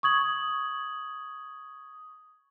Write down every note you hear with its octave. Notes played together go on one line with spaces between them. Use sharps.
C#6 D#6 G#6 F#7